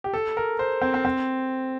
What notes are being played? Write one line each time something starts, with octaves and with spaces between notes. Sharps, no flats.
G4
A4
A#4
C5
C4
C4
C4